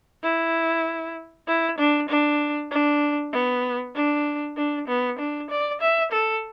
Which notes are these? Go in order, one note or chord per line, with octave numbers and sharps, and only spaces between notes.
E4
E4
D4
D4
D4
B3
D4
D4
B3
D4
D5
E5
A4